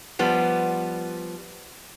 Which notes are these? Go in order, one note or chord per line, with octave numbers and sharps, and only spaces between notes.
F3 G3 B3